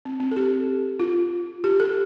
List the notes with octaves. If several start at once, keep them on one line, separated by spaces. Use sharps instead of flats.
C4
C4
A4
G4
F4
G4
A4